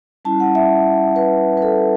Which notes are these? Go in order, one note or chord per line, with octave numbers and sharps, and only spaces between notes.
G3 C#4 E4 A5
F#5
E5
B4
B4
A4